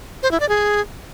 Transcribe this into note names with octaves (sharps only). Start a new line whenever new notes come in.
C5
E4
D5
G#4